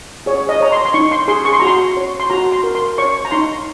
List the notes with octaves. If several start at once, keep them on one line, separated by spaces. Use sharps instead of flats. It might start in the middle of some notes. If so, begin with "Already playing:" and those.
G#4 C#5
D#5
C#5 A#5
C6
C6
D#4 C#6
C6
G#4 C6
C#6
C6
F#4 A#5
C6
C#5
C6
F#4 A#5
C6
A#4
C6
C#5 C#6
A#5
D#4 C6